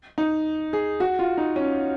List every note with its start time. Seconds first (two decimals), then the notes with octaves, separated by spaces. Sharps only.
0.18 D#4
0.73 G#4
1.00 F#4
1.19 F4
1.38 D#4
1.56 C#4